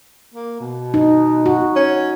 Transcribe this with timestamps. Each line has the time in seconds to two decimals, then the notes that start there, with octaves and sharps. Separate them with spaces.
0.34 A#3
0.60 B2
0.94 D#4
1.46 F#4
1.76 C#4